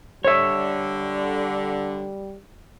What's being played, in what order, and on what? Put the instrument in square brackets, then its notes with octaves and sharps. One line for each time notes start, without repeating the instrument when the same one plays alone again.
[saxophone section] D3 [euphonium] G3 [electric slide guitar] C#5 E5